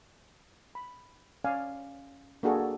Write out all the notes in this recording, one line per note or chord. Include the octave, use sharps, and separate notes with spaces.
B5
C#4 D5 F5 G#5
A#3 D4 F#4 G#4 A4